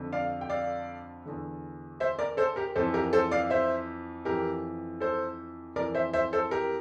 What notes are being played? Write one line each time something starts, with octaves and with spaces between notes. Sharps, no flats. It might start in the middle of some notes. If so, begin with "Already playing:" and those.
Already playing: F2 D3
D5 F5
G5
D5 F5
E2 D3
C5 E5
A#4 D5
A4 C5
G4 A#4
F2 E3 A4 C5
G4 A#4
A4 C5
D5 F5
C5 E5
F2 E3 G4 A#4
A4 C5
F2 E3 A#4 D5
C5 E5
C5 E5
A4 C5
G4 A#4